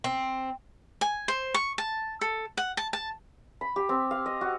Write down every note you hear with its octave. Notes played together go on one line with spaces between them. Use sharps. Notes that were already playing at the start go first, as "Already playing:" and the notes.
C4
G#5
C5
C#6
A5
A4
F#5
A5
A5
B5
G4
C4
F5
D#5
F#4